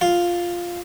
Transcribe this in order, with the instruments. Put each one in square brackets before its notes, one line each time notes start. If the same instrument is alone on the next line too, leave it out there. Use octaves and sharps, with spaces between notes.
[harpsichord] F4